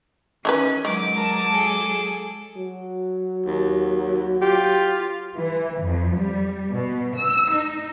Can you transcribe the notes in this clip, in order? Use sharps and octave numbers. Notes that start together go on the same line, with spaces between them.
D#3 E3 C#4 B4
D#3 F#3 G#3 D6
A#4 A5
G#4 A4
F#3
D#2
F4 G4
E3
F2
G3
B2
E6
D#4